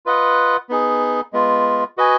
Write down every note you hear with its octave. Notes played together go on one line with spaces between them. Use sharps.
F4 B4 D#5 F#5
B3 D#4 G#4
G#3 B3 F4
F#4 B4 D#5 G#5